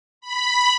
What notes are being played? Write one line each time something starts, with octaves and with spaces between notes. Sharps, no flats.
B5